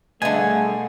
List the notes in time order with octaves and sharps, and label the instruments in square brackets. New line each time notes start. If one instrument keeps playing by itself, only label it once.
[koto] B2 D3 [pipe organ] G3 G#4 F5 [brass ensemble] A3 [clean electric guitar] G#5